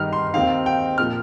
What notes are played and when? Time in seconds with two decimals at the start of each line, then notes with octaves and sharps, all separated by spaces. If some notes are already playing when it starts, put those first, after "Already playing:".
Already playing: G2 D#3 G3 D#4 F6
0.13 C6
0.34 D#2 D#3 C4 D#4 F5
0.66 G5
0.98 A#2 F3 F6